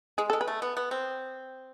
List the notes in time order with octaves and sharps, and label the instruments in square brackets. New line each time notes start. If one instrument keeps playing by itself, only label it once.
[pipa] G#3 [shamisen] G#4
[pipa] G#3 [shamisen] A4
[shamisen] B4
[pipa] A3
B3
B3
C4